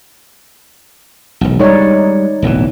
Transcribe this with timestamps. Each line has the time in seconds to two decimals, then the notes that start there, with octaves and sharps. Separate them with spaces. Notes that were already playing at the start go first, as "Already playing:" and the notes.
1.41 E1 B1
1.59 G3 G#3 D#4 C#5 D5
2.42 D1 B1 E3